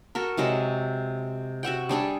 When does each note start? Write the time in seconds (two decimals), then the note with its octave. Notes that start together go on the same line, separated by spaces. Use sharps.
0.15 F#4 A4 A#4
0.37 C3 F#3 G#3 A4
1.63 F#4 E5 F#5 G5
1.89 G3 D4 G#4 A4